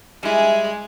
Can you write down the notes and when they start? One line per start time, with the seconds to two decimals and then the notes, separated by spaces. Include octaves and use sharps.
0.23 G3 G#3 E4 G#4